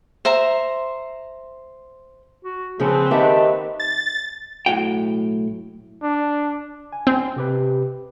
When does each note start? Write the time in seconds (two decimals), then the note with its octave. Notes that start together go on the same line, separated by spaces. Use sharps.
0.25 C5 E5 A#5
2.44 F#4
2.80 C#3 F3 A#3 C4 C#4 G#4 B4
3.11 D#3 G4 E5 F#5 A5
3.80 A6
4.66 B1 A2 F#4 G5
6.03 D4
6.93 G#5
7.07 C4
7.36 C3 G4 B4